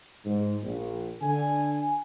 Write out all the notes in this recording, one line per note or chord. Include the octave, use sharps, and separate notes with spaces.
G#2
A#1
D3 G#5